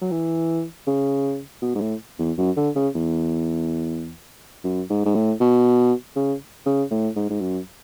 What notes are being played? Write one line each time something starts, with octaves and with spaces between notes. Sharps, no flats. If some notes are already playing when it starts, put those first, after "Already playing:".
F#3
E3
C#3
B2
G#2
A2
E2
F#2
D3
C#3
E2
F#2
G#2
G#2
A2
B2
C#3
C#3
A2
G#2
G#2
F#2